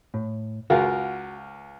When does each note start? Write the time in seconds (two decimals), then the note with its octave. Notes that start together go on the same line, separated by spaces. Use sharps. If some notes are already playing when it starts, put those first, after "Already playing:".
0.14 A2
0.70 C#2 F4 F#4 A#4